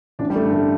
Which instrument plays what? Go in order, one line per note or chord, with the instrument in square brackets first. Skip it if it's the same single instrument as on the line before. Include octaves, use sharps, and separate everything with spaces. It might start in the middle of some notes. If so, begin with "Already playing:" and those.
[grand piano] A1 D4
G3
A3
G2 D3
A3